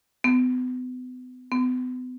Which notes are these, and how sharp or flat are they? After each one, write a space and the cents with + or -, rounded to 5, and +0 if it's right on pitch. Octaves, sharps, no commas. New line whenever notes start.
B3 +35
B3 +35